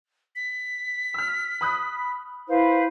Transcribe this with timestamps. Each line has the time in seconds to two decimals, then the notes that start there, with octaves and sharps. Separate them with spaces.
0.36 B6
1.14 E6 F6
1.61 B5 D#6 F#6
2.48 E4 B4 C5 F5